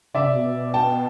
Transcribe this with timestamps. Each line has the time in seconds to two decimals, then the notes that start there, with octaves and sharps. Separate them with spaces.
0.14 C#3 D5 E5
0.24 C3
0.35 B2
0.74 G5 A5